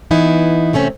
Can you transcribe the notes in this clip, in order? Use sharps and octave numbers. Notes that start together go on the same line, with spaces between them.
E3 B3 D#4 E4
C3 A3 C4 C#4